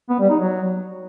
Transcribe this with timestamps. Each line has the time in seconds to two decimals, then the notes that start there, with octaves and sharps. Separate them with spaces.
0.09 B3
0.20 G3
0.30 D#4
0.40 F#3